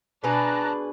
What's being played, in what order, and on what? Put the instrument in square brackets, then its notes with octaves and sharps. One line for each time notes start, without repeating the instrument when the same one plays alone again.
[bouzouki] B2 G#4 B4 [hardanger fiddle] D4 [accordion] A5 A#5 F#6